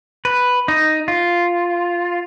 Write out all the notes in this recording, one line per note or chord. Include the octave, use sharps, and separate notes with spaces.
B4
D#4
F4